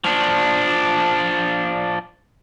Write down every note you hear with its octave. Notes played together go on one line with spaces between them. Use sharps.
F3 D4